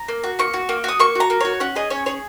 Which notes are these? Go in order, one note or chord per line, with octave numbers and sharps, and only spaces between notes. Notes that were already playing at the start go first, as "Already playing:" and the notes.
Already playing: A#5
A#3
F#4
A#3 C#6
F#4
A#3
F#4 D#6
A#3 C#6
F#4 A#5
A#3
F#4 C#5
C#4 F#5
G#4 D#5
C#4 C#5
G#4 C#5